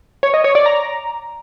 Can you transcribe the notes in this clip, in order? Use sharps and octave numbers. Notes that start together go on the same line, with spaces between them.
C#5
D#5
C#5
D5
A#5